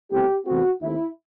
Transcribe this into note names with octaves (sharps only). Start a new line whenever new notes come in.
C2 B2 A3 C4 G4
E2 C3 E3 A3 C4 F#4
D#2 D#3 A3 C4 E4